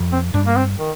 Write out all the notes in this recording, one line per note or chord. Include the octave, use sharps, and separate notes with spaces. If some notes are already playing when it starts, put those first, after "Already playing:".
Already playing: F2
C4
G2 D4
A#3
C4
D#3